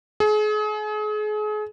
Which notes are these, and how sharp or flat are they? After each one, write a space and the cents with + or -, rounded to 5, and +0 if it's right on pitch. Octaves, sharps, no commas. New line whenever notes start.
G#4 +35